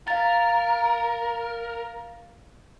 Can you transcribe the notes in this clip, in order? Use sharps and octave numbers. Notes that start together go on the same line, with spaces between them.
A#4 F5 A6